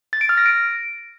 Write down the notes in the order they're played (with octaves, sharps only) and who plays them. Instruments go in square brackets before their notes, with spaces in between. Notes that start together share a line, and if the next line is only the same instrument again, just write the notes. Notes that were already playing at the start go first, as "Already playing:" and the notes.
[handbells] A6
D7
F6
A#6
D7